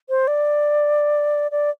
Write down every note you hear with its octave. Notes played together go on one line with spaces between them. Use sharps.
C5
D5
D5